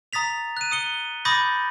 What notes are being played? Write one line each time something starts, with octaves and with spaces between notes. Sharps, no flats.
A#5 D#6 A6 B6 F7
F#6 D#7
D#6 C#7 G7
B5 D6 D#6 G6 A6 A#6